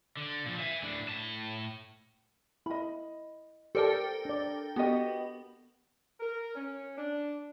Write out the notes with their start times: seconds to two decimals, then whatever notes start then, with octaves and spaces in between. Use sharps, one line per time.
0.17 D3
0.46 A#2 F3
0.60 E5 G#5
0.82 A2 D4
1.08 A2 A5
2.66 E4 D#5 B5
3.75 G4 A4 A#4 C5 D5 G5 A5
4.25 D4 D5
4.76 B3 F#4 G4 D#5
6.20 A#4
6.55 C#4
6.96 D4